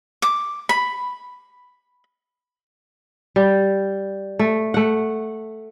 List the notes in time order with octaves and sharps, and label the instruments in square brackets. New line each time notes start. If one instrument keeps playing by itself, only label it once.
[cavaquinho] D6
B5
[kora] G3
A3
A3 F#5